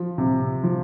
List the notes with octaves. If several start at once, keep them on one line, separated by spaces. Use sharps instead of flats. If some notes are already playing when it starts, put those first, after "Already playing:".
Already playing: F3
C3
F3